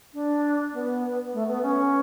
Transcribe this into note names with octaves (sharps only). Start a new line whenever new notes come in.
D4
B3
A3
B3
C#4